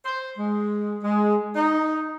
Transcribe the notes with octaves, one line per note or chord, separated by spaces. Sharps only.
C5
G#3
G#3
D#4